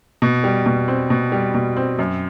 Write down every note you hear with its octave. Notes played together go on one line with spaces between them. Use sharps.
B2
G3
B2
C4
B2
G3
B2
C4
F#2